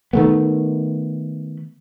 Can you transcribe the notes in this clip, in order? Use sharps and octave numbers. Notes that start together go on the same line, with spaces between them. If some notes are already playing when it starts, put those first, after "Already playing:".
D#3 A3 B3